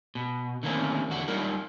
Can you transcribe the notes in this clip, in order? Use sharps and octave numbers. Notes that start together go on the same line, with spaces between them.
B2
D3 D#3 A3 A#3 C4 C#4
E2 D3 F#4
F#3 G3 A#3 D#4 A#4